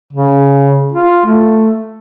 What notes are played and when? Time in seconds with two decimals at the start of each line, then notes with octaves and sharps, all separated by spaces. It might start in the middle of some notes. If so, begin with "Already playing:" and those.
0.13 C#3
0.92 F4
1.25 A3